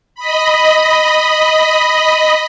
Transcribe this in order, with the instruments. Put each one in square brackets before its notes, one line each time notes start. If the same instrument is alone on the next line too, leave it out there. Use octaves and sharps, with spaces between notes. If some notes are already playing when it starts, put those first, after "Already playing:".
[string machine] D#5 B5